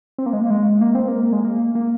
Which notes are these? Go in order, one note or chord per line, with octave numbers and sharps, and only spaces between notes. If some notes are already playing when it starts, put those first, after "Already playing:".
C4
A#3
G#3
A#3
G#3
A#3
C4
A#3
G#3
A#3
A#3